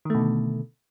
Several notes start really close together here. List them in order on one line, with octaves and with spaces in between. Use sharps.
D#3 A3 B2 D3